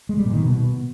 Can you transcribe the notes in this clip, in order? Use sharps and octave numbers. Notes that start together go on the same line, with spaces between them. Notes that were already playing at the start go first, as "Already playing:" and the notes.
G#3
G3
A#2
D#3
B2